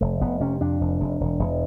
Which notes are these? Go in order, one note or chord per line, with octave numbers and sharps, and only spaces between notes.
F1 A3
F1 B3
C3 C#4
F2 D4
F1
F1
E1
E1